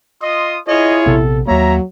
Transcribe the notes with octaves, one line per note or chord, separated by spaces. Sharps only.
F4 D#5 C6 D#6
E4 F4 G#4 C#5 D#5
A#1 C3 B3 A4
D#2 F#3 A#3 C#5 E5 A#5